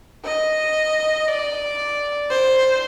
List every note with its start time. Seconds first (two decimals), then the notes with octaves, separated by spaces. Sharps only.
0.24 D#5
1.27 D5
2.30 C5